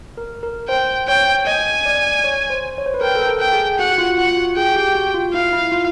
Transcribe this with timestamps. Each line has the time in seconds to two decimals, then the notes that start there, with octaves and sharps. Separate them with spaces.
0.17 A#4
0.43 A#4
0.69 C5 G5
1.08 C#5 G5
1.46 D#5 G#5
1.86 D5
2.24 C#5
2.50 C5
2.78 C#5
2.86 C5
2.94 B4
3.01 A#4 G5
3.15 A4
3.27 A#4
3.40 G5
3.53 G#4
3.78 F#4 F#5
3.92 F#4
3.98 F4
4.10 F#4
4.18 F4 F#5
4.28 F4
4.37 F#4
4.57 G#4 G5
4.76 G4
4.95 F#4
5.14 F4
5.33 E4 F5
5.53 E4
5.72 F4